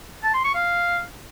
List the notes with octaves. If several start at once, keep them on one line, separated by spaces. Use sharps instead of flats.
A5
C6
C#6
F5